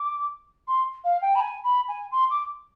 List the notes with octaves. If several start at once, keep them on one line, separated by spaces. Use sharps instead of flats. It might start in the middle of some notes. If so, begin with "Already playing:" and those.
Already playing: D6
C6
F5
G5
B5
G#5
B5
G#5
C6
D6